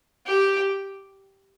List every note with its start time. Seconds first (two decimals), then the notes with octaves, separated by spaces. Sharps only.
0.26 G4